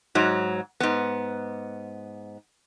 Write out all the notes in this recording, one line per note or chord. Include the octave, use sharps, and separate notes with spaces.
G#2 F#3
G#2 B3